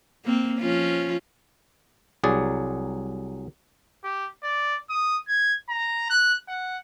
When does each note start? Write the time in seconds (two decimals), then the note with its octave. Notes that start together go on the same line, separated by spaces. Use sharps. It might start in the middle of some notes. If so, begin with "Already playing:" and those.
0.25 A#3 C4
0.60 F3 C#4 F4
2.24 C2 F#3 G#4 D5
4.04 G4
4.43 D5
4.90 D#6
5.28 G#6
5.69 A#5
6.10 F#6
6.48 F#5